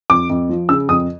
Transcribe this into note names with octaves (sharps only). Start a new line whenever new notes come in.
F2 D6
F2
F3
C#3 E6
F2 D#6